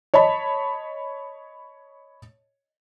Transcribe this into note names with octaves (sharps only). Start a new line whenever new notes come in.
C#5 D#5 A5 B5